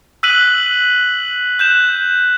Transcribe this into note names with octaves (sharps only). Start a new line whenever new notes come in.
E6 F#6 B6 D#7 F#7
F#6 G6 E7